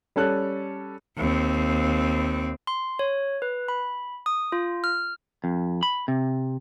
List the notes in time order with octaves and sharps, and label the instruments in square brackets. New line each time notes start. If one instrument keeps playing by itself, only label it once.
[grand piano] G3 C#4 A4 F#6
[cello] D#2 C4
[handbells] C6
C#5
B4
B5
D#6
F4
F6
[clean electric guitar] F2
B5
C3